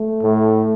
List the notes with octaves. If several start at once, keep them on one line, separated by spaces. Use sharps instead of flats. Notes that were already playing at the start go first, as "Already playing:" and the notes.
Already playing: A3
A2